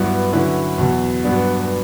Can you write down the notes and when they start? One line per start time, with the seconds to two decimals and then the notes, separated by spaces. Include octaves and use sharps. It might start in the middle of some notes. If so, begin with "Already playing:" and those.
Already playing: G2 F#3 B3 E4
0.32 D3 F#3 C#4 E4 B4
0.78 E2 B2 F#3
1.23 G2 F#3 B3 D4